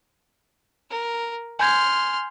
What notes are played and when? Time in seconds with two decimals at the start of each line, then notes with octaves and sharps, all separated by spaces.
0.90 A#4
1.59 G#5 C6 F6 G6 G#6